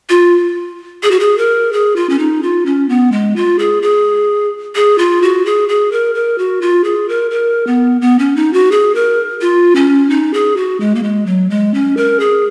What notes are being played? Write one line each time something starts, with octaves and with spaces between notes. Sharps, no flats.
F4
G#4
F#4
G#4
A#4
G#4
F4
C#4
D#4
F4
C#4
B3
G#3
F4
G#4
G#4
G#4
F4
F#4
G#4
G#4
A#4
A#4
F#4
F4
G#4
A#4
A#4
B3
B3
C#4
D#4
F#4
G#4
A#4
F4
C#4
D#4
G#4
F#4
G#3
A#3
G#3
F#3
G#3
C#4
A#4
G#4